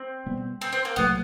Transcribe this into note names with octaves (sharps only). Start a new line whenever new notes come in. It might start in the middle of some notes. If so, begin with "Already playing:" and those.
Already playing: C4
B2 G3 B3
C4
C4
A#3
C2 A#2 F#3 A3 B3